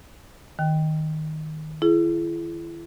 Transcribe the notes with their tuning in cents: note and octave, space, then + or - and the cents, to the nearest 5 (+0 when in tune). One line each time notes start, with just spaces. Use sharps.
D#3 +0 G5 +0
E4 +35 G#4 +35